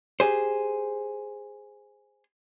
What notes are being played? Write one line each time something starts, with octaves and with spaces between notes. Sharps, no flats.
G4 G#4 C5